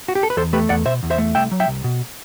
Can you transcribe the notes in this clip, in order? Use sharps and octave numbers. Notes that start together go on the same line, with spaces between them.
F#4
G4
A4
B4
E2 A4 C5
A3 G4 B4
E2 D5 F#5
B2 C5 E5
E2
C5 E5
A3
C2 E5 G5
F#3
E5 G5
C2
B2